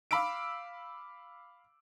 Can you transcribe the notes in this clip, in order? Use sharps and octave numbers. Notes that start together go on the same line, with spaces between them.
F5 B5 D6 E6 D7